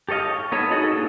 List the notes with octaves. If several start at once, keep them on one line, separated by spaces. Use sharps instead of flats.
G4 A4 C#5 D#5 F5
C#6
B3 D#4 A4 C#5
D#4 F#4 G#4 A4 D#5
A#3 C#4 D4 F4 A4